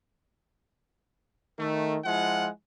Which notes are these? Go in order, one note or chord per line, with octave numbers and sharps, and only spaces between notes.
D#3 A3
F3 G#3 E4 F4 F#5